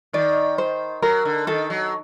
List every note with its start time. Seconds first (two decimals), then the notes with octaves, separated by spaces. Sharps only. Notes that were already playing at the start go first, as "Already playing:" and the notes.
0.13 D#3 D5
0.58 C5
1.02 F#3 A#4
1.25 D3
1.47 D#3 A4
1.70 F#3